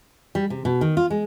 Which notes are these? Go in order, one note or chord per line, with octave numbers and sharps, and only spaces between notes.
G3
C3
B2
D#3
F4
G#3